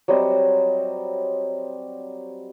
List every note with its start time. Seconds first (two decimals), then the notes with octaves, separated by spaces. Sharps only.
0.08 F#3 G3 C4 D#5